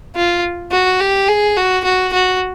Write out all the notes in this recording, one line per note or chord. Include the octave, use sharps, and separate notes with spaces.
F4
F#4
G4
G#4
F#4
F#4
F#4